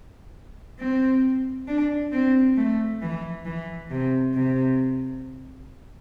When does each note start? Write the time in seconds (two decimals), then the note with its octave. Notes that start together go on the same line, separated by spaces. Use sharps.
0.79 C4
1.68 D4
2.12 C4
2.57 A3
3.02 E3
3.45 E3
3.90 C3
4.34 C3